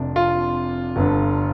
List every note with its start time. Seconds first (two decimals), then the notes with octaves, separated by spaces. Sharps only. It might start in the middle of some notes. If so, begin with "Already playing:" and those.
Already playing: F1 F2 C3 D4
0.16 F4
0.96 G1 G2 D3